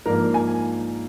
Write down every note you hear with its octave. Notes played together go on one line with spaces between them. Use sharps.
G#2 F3 A#3 D4 A#4
G#5